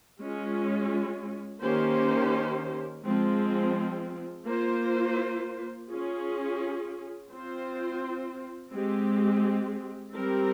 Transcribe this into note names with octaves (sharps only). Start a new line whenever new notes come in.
G#3 C#4 F4
D#3 A#3 C#4 G4 C5
F3 G#3 C4
A#3 F4 C5
C#4 F4 G#4
C4 F4 C5
G#3 C4 G4
G3 C4 G4 A#4